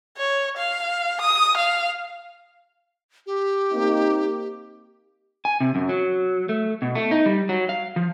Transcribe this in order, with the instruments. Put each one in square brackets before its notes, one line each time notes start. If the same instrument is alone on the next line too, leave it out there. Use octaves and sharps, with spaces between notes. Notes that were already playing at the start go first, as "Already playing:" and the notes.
[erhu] C#5
F5
D#6
F5
[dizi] G4
[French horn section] A#3 C4 D#4
[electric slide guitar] G#5
C3
F#2
F#3
A3
B2
A3
D#4
G3
F#3
F5
F3